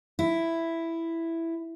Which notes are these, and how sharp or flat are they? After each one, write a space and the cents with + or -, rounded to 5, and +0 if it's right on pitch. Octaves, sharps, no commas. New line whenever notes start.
E4 +5